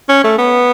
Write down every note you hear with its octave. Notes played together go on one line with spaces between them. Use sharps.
C#4
A3
B3